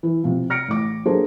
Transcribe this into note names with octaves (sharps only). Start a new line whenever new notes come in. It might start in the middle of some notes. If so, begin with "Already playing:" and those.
E3
C3 F3
F6 A#6 C#7 D7
A1 D6
F#3 A#3 D4 G#4 A4 C5